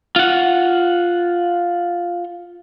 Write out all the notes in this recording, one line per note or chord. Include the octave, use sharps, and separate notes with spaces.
F4 F#5